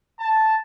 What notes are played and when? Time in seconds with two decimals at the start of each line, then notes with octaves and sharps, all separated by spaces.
0.19 A5